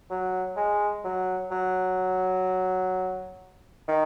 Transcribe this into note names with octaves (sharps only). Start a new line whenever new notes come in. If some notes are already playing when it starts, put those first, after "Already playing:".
F#3
G#3
F#3
F#3
D#3